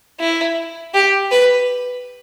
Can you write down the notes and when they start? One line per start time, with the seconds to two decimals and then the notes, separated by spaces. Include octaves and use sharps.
0.20 E4
0.94 G4
1.32 B4